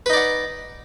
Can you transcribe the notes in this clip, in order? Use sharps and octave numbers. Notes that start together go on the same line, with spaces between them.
D#4 B4 D5 F#5